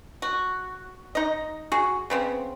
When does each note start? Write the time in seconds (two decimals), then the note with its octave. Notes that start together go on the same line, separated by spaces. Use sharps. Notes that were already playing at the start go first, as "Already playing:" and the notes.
0.22 F#4
1.15 D#4 D#5
1.72 F#4 G#4
2.10 C#3 B3 C4